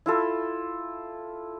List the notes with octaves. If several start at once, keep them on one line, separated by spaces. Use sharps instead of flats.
E4 F4 A4